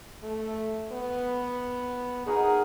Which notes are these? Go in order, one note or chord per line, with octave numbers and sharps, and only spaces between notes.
A3
B3
D#4 F#4 G#4 A#4